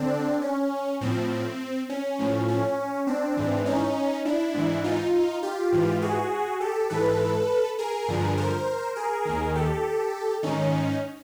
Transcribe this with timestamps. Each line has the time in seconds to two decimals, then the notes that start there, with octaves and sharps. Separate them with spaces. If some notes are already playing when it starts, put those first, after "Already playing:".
Already playing: D3 C4 D4
0.42 C#4
1.01 A2 F3 C4
1.89 C#4
2.19 A2 F3
2.48 C#4
3.07 C4 D4
3.37 G#2 E3
3.66 C#4 D#4
4.25 D4 E4
4.54 G#2 E3
4.84 D#4 F4
5.43 F4 G4
5.72 G#2 E3
6.02 F#4 G#4
6.60 G4 A4
6.90 G#2 E3 A4 B4
7.79 G#4 A#4
8.08 G2 D3 F3
8.37 A#4 C5
8.96 G#4 A#4
9.25 D#2 D#3
9.55 G4 A4
10.43 G#2 D#3 C#4 D#4